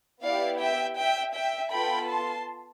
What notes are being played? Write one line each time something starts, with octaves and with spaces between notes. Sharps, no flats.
B3 E4 G4 D5 F5
E5 G5
E5 G5
E5 G5
B3 F4 A4 G5 B5
A5 C6